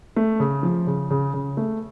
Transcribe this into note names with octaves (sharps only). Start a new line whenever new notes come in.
A3
C#3
F3
C#3
C#3
C#3
A3